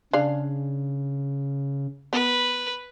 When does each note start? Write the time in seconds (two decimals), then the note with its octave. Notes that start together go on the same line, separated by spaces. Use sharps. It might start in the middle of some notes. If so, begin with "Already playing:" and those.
0.13 C#3 D4 G#4 F5
2.13 B3 B4